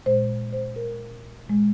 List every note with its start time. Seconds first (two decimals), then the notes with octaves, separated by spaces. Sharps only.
0.06 A#2 G#3 C5
0.53 C5
0.76 A#4
1.46 A#2 G#3